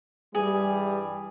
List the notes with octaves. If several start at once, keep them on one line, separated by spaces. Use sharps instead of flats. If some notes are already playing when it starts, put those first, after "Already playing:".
G2 E3 G3 G#4